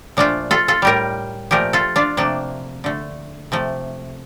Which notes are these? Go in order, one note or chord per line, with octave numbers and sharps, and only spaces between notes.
A#2 F3 A3 D4 F4
F4 A4
F4 A4
A2 G3 G4 A#4
A#2 F3 A3 G4 A#4
F4 A4
D4 F4
C3 F3 A3 A#3 D4
D3 A3
C3 F3 A3